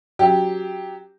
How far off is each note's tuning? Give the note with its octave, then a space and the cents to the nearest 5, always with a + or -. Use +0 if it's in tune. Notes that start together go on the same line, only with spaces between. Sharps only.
F#3 +0 C#4 +10 G4 +0